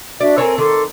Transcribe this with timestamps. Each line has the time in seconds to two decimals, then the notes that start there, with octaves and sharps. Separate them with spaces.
0.21 D4 F#4 D5 E5
0.38 C4 A4 A#4 C#5 G#5
0.58 D#3 A4 C6 D6